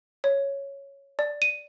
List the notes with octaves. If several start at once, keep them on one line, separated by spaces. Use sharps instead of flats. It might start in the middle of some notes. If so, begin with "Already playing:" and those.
C#5
D5
D#7